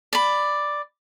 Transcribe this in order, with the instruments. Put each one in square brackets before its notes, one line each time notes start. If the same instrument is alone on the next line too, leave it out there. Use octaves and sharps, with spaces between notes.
[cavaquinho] D5 B5